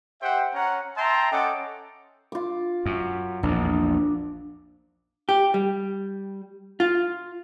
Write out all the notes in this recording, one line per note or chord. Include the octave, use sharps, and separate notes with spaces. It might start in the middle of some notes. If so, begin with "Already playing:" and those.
G4 C5 E5 F#5 G5
C#4 F#5 A#5
E5 G5 A5 A#5 C6
C#4 A4 D#5 F#5 G5 D6
F4 D6
F#2
A#1 E2 D4
G4
G3
F4